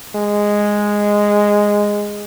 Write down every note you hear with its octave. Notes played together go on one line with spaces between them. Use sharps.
G#3